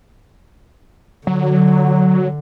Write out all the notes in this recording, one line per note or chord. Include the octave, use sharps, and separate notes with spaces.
D3 F#3